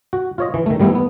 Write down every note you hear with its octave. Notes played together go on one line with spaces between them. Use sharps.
F#4
F4 C#5 D#5
E3
D#3 A3
D#3 G3 A3 B3 E4
B3